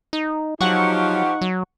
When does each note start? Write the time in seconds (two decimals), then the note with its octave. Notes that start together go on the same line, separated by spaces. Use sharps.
0.13 D#4
0.61 F3 F#3 D#4 G4 F#5 C#6
1.41 F#3